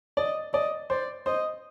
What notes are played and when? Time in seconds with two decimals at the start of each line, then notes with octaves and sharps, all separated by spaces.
0.17 D5 D#5
0.53 D5 D#5
0.90 C5 D5
1.26 C5 D#5